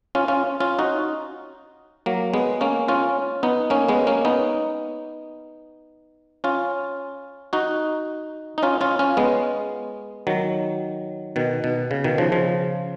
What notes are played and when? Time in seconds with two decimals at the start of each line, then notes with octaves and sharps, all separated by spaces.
0.15 C#4 F4
0.28 C#4 F4
0.60 C#4 F4
0.79 D#4 F#4
2.06 F#3 A#3
2.34 G#3 B3
2.61 A#3 C#4
2.88 C#4 F4
3.43 B3 D#4
3.70 A#3 C#4
3.89 G#3 B3
4.07 A#3 C#4
4.25 B3 D#4
6.44 C#4 F4
7.53 D#4 F#4
8.58 D#4
8.63 C#4 F4
8.81 C#4 F4
8.99 C#4 F4
9.17 G#3 B3
10.27 D#3 F#3
11.36 B2 D#3
11.64 B2
11.91 C#3
12.04 B2 D#3
12.18 C#3 F3
12.32 C#3 F3